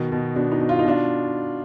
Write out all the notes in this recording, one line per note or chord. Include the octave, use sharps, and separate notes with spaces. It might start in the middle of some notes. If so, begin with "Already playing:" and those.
Already playing: B2 D#3 D#4
B2
B2 D4
D#4
B2
F4
D#4
B2 D4 F4